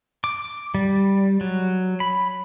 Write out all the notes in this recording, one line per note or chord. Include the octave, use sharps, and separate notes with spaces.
D6
G3
F#3
B5